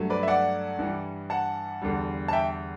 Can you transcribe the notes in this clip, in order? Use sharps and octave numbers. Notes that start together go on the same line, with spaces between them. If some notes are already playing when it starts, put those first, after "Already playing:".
Already playing: G2 F#3 A3
B4 D5
E5
D5 F#5
G2 E3 G3
F#5 A5
E2 D3 G3
A5
E5 G5